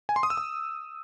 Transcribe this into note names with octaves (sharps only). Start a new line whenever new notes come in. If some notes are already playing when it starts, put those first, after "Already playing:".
G#5
C6
D#6
E6
D#6